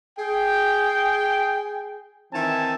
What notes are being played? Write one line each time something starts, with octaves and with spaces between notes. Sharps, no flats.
G#4 G5
D#3 E3 C4 E5 G#5 A5